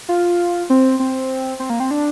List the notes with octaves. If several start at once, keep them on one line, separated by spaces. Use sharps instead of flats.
F4
C4
C4
C4
A#3
C4
D4